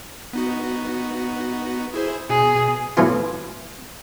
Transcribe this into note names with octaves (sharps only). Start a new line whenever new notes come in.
B3 D#4 F#4
E4 G#4 C5
B2 G#4
A2 E3 F#3 B3 F4